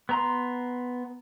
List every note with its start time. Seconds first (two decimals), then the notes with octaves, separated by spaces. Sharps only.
0.09 B3 A#5 C6